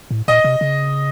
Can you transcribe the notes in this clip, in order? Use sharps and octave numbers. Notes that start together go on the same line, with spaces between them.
A2
A#2 D#5
C3
C#3